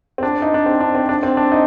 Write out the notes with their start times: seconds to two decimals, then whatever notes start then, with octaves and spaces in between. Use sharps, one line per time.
0.18 C4
0.23 D4
0.42 D#4
0.54 D4
0.66 C4
0.80 D4
0.95 C4
1.09 D4
1.23 C4
1.37 D4
1.52 D#4